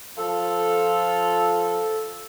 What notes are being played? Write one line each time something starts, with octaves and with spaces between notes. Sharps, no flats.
F3 F4 A4